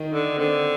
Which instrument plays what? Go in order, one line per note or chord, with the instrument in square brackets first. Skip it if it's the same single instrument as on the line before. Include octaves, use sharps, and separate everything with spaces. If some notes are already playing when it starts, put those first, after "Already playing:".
Already playing: [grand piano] D#3 D#4
[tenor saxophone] D3
[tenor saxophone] D3 [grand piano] C4